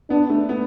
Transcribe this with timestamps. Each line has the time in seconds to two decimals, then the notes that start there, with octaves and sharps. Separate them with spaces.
0.10 B3 D4
0.30 A3
0.49 B3